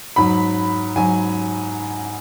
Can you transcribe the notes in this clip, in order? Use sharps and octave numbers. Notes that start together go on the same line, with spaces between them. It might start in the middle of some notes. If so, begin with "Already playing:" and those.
G#2 F#3 B5
G#2 F#3 G#5